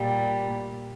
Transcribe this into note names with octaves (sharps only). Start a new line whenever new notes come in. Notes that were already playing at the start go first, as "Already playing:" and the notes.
Already playing: A#2 G3